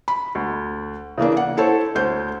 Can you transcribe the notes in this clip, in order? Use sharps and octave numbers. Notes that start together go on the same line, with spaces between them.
B5
D2
C#3 E3 A#3 D4
F#5
E4 A4 C5 C#5
D2 C5 G6